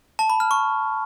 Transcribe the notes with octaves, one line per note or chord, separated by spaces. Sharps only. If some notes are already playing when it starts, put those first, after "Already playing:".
A5
B5
F6
C#6